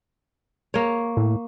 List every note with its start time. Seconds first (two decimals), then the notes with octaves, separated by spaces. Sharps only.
0.74 A#3 C#5
1.17 A2